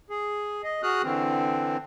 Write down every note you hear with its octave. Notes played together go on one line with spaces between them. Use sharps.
G#4
D#5
F#4 G#4 D#6 F6 F#6
D3 E3 C4